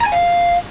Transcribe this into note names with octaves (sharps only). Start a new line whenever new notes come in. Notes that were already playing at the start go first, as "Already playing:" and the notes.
A#5
G#5
F5